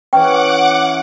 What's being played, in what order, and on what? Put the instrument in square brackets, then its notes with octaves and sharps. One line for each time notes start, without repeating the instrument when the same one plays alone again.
[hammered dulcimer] E3 C#4 [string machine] F#5 D6 [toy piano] G5